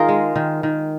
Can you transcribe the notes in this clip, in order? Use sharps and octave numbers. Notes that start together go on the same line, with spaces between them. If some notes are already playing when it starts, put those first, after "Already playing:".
Already playing: D#3 F4 G#4 A#4
G#3
D#3
D#3